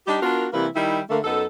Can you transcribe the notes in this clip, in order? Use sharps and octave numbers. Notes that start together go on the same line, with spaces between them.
G3 D4 D#4 G4
B3 D4 F4 F#4 A#4
C3 E3 G3 A#3 E4 B4
D#3 G3 D#4 E4
D3 A3 A#3
F#2 B3 D#4 A4